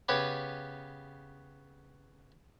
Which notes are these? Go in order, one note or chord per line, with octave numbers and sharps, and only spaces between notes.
C#3 B3 G4 B4 C#5 B5